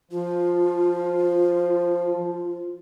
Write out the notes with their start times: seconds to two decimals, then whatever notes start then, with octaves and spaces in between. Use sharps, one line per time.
0.11 F3 F4